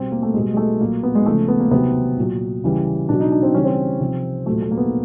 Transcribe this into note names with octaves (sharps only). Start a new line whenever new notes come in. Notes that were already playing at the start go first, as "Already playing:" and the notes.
Already playing: B2 G3 C4
A#3
A3
B2 G3 G#3
G#3
A3
A#2 F#3 A#3
B3
G#3
C#3 F3 A3
B3
A#3
C3 D#3 F#3 B3
A#2 F#3
C#3 E3 G3
B2 F#3 D4
D#4
D4
C4
C#3 E3 G3 C#4
C4
C3 F3
A#2 F#3 A3
A3
A#3
B3